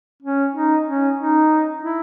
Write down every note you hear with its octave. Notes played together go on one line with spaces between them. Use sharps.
C#4
D#4
C#4
D#4
E4